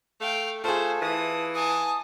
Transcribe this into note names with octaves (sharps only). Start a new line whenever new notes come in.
A3 F5 G5
A3 F4 G#4 C5 A5
E3 D#6
G#5 A5 D#6